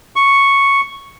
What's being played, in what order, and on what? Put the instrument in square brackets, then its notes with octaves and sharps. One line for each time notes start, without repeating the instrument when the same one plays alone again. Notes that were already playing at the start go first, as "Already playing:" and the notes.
[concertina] C#6